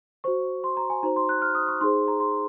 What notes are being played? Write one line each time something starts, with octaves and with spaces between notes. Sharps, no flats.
F#4 C5 C#6
C6
A#5
G#5
D#4 F#4 C5 A#5
C6
F#6
F6
D#6
C#6
D#4 G#4 C5 C6
A#5
C6